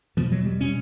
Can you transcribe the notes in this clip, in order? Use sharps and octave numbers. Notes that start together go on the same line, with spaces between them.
E2 B2 F3
F#3
G3
B2 C#4